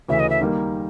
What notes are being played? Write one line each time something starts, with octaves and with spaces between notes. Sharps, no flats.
D2 C#3 E3 E5
D#5
E5
D#3 G3 A#3